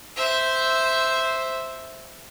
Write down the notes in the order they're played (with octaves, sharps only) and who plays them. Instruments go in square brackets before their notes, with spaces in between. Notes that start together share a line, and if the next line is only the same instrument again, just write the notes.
[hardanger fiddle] C5 E5